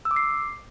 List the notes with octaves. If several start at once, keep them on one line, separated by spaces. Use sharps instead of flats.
E6
D6
C7